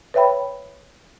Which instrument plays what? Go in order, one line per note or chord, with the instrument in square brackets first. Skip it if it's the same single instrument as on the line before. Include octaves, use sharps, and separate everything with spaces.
[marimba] B4 C#5 E5 G5 B5